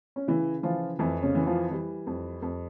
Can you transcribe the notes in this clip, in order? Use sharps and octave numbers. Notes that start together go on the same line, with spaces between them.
C#4
C#3 E3 E4
E3 F3 F4
F2 E3 E4
C#3 C#4
E3
F3 F4
E3 G3
F2
F2